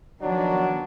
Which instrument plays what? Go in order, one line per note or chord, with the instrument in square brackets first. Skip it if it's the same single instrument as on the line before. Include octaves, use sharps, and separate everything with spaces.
[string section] D#3 F3 B3 [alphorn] F#3 [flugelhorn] D4